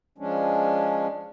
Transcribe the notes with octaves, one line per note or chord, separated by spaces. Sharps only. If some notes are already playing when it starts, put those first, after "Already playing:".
F3 G#3 C#4 D4